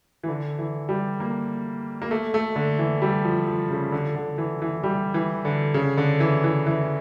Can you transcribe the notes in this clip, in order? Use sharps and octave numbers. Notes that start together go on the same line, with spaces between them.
E3
D3
E3
G3
A#3
A#3
A3
A3
D3
E3
G3
F3
F3
C#3
D3
D3
E3
E3
G3
E3
D3
C#3
D3
E3
E3
E3